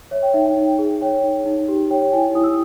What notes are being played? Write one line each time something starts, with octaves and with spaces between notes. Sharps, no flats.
C#5 E5
G5
D#4 E5
G5
D#4
G#4
C#5 G5
D#4
D#4
G4
C#5 G5
G5
E4 G#5
E4 D#6
E6